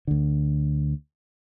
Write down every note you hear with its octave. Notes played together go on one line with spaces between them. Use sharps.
D2 D3